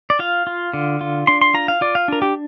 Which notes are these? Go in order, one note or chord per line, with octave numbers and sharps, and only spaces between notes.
D5
F4 F5
F4
D3
F4
D4 C6
C6
F4 A#5
F5
F4 D5
F5
D4 A#4
G4